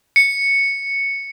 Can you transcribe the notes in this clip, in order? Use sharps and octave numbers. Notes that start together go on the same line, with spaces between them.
C#7